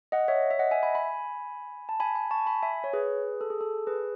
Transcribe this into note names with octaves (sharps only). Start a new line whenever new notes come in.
D#5 F#5
C#5 E5
E5
D#5 F#5
E5 G#5
G#5 B5
G#5 B5
A5
G#5 B5
G#5 B5
A5 C#6
G#5 B5
E5 G#5
C#5
G#4 B4
A4
G#4
A4
G#4 B4